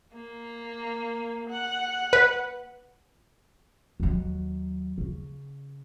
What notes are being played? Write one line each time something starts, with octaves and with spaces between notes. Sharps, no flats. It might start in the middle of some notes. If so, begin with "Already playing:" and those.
A#3
F#5
B4
D#2 F#3
C#3